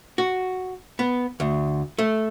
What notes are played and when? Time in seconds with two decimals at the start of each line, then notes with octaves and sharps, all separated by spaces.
0.18 F#4
0.99 B3
1.40 D2
1.98 A3